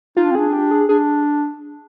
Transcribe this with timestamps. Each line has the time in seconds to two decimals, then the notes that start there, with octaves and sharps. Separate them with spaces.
0.16 D#4 F4
0.23 D4
0.31 C4
0.35 D4 G#4
0.53 G4
0.71 G#4
0.89 D4 G#4